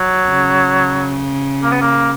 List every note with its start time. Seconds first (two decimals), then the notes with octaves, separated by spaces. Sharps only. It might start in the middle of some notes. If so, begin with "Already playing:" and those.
Already playing: F#3
0.27 C#3
1.63 A#3
1.72 B3
1.81 A#3